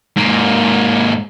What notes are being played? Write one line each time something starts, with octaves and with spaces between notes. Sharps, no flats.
G#2 A#3